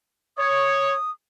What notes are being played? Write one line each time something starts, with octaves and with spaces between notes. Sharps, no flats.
C#5 D#6